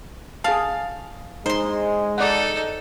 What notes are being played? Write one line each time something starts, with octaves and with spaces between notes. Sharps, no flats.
G#4 F5 A5
G#3 D#4 C5 C6
D#4 A4 D5 F#5